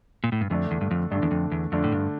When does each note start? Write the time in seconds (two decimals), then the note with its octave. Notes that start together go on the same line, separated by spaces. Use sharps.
0.24 A#2
0.32 A2
0.41 G2
0.50 F2 D3 A3 D4
0.71 E2
0.81 G2
0.91 F2
1.11 G2 D3 A3 D4
1.22 E2
1.31 F2
1.51 E2
1.72 F2 D3 A3 D4
1.84 A2
1.92 G2